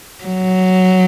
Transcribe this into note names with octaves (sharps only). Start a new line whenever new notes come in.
F#3